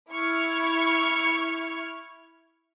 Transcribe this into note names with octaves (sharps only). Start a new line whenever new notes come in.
E4 C#6 F6 G#6